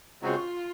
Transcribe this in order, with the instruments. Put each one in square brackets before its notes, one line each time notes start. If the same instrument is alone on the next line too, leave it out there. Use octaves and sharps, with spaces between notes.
[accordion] C#3 G#3 C4 F#4 [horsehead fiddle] F4